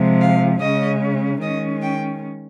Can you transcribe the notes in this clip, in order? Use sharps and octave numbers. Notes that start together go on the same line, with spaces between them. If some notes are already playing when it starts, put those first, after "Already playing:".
Already playing: C3 F3 G#3
F5
C#3 G#3 C#4 D#5
D#3 G#3 C#4 D#5
G5